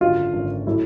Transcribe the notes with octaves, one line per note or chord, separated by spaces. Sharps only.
G#1 F#2 D3 F4
G#1 F#2 D3
A2 F#3 A3 E4